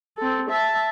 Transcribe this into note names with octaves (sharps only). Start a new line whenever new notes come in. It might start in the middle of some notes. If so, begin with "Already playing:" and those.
C4 A4
E5 A5